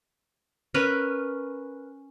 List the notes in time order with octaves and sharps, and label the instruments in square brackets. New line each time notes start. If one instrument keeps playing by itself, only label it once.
[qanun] C#4 A#4 B4